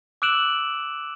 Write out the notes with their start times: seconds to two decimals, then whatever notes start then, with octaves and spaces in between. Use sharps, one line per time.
0.22 D6 E6 F#6 D7 E7 F#7